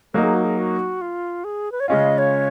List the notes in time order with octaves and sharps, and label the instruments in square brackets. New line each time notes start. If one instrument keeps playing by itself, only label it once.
[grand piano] F#3 A#3 D#4 [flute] A#4
[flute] G#4
F#4
G#4
F#4
F4
G#4
B4
C#5
[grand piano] C#3 G#3 C#4 F4 [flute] D#5
[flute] C#5